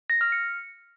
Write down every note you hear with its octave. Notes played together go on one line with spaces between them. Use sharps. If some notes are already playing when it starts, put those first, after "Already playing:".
A#6
F6
C#7